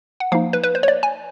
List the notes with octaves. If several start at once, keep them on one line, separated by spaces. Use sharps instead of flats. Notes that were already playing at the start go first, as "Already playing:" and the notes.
F#5
F3 A#3 D#4 F5
B4
B4
C5
C#5
D5
G#5